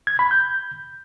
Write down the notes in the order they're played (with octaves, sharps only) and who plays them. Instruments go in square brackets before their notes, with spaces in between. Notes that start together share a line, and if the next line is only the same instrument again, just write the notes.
[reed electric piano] G#6
B5
G6